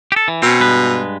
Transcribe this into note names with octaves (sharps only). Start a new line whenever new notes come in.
G4 A4
E3
B2 C4 C#4
G2 G#3 B4